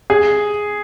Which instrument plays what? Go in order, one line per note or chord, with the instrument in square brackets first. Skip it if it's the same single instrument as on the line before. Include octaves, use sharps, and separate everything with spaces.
[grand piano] G#4